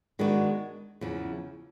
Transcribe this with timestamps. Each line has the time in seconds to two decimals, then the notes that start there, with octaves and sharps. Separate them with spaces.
0.19 D#3 G#3 B3 D4 F#4
1.01 E2 C#3 F3